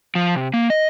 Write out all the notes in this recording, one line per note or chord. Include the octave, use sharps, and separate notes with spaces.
F3
C3
A#3
D#5